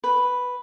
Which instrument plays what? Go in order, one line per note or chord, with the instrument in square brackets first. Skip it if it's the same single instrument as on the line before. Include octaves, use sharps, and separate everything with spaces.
[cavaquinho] B4